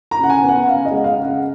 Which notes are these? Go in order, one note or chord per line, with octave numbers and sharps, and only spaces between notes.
A#5
C#3 F#5
G#5
B3
F#5
C#3 F5
D#5
G#3
F5
C#3
F#5